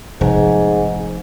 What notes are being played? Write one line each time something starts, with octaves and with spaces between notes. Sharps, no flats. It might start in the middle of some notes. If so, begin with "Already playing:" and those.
F1 G#2